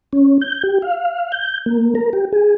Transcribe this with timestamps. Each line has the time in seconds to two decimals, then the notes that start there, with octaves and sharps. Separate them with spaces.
0.13 C#4
0.42 G6
0.63 G4
0.82 F5
1.32 G6
1.66 A#3
1.95 A#4
2.13 G4
2.32 G#4